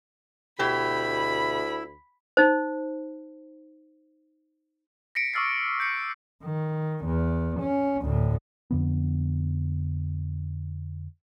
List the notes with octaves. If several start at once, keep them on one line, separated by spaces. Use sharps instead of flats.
D2 B2 E4 G4 B5
D#4 C5
A#6 B6 C#7 D7
C#6 D6 E6 F6 A6 C7
F6 G6 C7 C#7
D#3
E2
C#4
D2 A2
F2 D3 B3